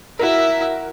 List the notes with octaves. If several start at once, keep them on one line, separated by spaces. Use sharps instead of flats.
E4 F#4 A#4 E5